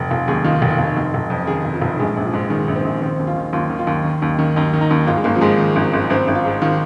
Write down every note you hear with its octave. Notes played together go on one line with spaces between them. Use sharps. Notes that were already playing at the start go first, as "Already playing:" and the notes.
Already playing: F1
F1 F4
D#2 G#4
D#3 F4
F1
F4
F1
F1
F1
F2
D#3 G#4
F1
F3
F1
A#1 G#3
A#1
F3
G#2
D#3 G#3
A#1
C4
A#1
D#3 C4
D#2
F4
D#3
D#2 F4
D#3
F4
D#2
D#3
D#2
D#3
D#2 D#4
D#3
D#4
D#2
G#1 F4
G#3
G#1 A#3
F3
G#2 G#3
D#3
G#1
G#1
G#1 C4
G#1
F4
G#2
D#3 F4